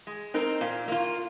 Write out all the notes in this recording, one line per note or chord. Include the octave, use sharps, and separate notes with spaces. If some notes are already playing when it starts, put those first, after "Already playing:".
G#3
C4 D#4 A#4
A#2
A#3 F4